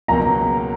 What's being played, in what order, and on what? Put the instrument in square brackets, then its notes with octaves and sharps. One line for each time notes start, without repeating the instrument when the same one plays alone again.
[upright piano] C#2 B2 F#3 A#3 [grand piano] A#5